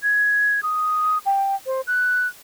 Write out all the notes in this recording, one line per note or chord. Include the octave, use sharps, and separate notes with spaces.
G#6
D#6
G5
C5
F#6